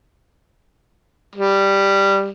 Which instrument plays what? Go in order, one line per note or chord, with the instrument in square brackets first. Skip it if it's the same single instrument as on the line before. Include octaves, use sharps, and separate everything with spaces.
[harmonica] G3